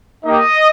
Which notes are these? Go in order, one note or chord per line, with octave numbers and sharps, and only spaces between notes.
A#3 D#4 G4 D#5